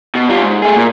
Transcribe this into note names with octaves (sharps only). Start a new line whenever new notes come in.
B2
G3 F4
G#2
A3 G#4
A#2